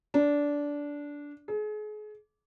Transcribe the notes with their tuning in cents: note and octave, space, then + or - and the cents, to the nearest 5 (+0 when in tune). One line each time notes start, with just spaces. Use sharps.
D4 -15
G#4 +35